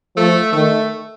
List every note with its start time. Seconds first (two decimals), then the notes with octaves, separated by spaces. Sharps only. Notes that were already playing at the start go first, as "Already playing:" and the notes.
0.16 F3 A3
0.53 D#3 A3